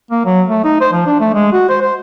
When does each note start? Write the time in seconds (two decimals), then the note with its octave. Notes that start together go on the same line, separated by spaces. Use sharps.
0.11 A#3
0.26 F#3
0.49 A3
0.64 D#4
0.81 C5
0.93 F3
1.06 D4
1.20 A3
1.34 G#3
1.52 F#4
1.69 C5
1.82 C5